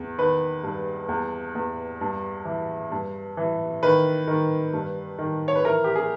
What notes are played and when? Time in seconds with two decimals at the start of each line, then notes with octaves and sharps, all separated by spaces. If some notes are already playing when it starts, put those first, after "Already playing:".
Already playing: E2
0.18 D#3 B4
0.64 G2
1.09 E2
1.55 E2
2.01 G2
2.45 E3
2.92 G2
3.37 E3
3.83 D#3 B4
4.27 D#3
4.73 G2
5.19 D#3
5.48 C#5
5.55 B4
5.64 E3 A#4
5.84 G4
5.96 G#4